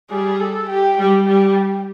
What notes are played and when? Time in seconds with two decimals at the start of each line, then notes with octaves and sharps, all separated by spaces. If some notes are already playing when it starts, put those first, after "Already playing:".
0.11 G3 G#4
0.40 A4
0.70 G4
0.99 G3 G4
1.27 G3